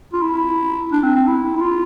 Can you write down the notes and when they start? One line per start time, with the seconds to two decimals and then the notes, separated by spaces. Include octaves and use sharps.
0.13 F4
0.22 E4
0.92 D4
1.03 C4
1.16 C4
1.27 E4
1.56 E4
1.61 F4